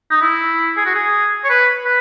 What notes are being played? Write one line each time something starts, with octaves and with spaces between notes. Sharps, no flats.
D#4
E4
G#4
F#4
G#4
C#5
B4
B4